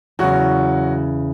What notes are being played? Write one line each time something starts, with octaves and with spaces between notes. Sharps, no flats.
E2 C#3 F#3 F#4